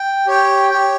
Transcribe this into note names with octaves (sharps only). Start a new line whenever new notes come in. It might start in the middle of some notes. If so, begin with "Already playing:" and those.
Already playing: G5
G4 C#5 G5
G4 C#5 G5